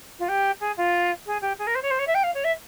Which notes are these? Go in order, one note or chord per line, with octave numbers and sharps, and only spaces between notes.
F4
G4
G#4
F4
G#4
G4
G#4
A#4
C5
C#5
C5
C#5
E5
G5
F5
C#5
E5